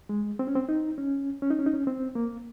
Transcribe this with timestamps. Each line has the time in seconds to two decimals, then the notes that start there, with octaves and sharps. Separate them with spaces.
0.09 G#3
0.39 C4
0.47 C#4
0.55 C4
0.69 D#4
0.98 C#4
1.42 C#4
1.50 D#4
1.59 C#4
1.66 D#4
1.74 C#4
1.87 C4
2.15 A#3